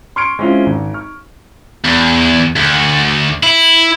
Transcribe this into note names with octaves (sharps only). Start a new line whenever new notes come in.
C6 C#6 F6 G#6 C#7 D7
G#3 C4 C#4 E4 F4
G#1
C#6 F6
E2
D2
E4